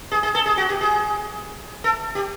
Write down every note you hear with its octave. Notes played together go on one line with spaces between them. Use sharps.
G#4
G#4
A4
G#4
F#4
G4
G#4
A4
G4